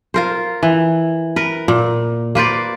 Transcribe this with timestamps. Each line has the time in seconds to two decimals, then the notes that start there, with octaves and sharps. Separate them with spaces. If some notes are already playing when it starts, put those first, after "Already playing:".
0.14 F4 A#4 C5
0.63 E3
1.36 A#4 B4
1.68 A#2
2.35 A#3 B4 C5 D5